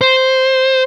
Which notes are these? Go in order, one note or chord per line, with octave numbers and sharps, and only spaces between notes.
C5